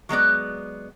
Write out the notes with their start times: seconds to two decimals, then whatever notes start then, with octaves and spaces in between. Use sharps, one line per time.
0.09 F#3 G#3 B3 D5